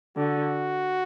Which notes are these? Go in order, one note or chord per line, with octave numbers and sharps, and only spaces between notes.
D3 F#4